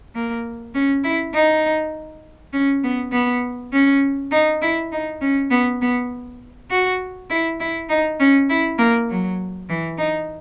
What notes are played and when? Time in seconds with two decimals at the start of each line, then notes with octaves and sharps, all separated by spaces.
0.15 A#3
0.74 C#4
1.04 E4
1.34 D#4
2.53 C#4
2.83 B3
3.12 B3
3.72 C#4
4.31 D#4
4.62 E4
4.92 D#4
5.21 C#4
5.51 B3
5.81 B3
6.70 F#4
7.30 E4
7.60 E4
7.89 D#4
8.19 C#4
8.49 E4
8.78 A#3
9.09 F#3
9.69 E3
9.98 D#4